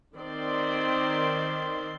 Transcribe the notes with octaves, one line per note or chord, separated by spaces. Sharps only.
D#3 C4 D5 C6